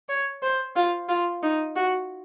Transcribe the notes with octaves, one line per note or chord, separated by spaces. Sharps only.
C#5
C5
F4
F4
D#4
F#4